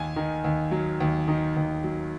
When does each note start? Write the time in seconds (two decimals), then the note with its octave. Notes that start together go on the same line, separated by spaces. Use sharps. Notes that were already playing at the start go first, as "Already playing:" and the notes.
Already playing: D#2 G#5
0.16 D#3
0.44 D#2
0.71 F#3
1.00 D#2
1.28 D#3
1.57 D#2
1.84 F#3